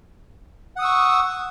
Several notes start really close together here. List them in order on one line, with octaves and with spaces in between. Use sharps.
F#5 D#6 E6 C#6